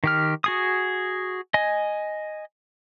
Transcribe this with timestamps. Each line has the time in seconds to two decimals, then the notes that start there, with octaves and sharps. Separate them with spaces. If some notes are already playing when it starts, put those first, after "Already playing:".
0.04 D#3 G4 F6
0.44 F#4 G#4 D#6
1.54 D#5 G#5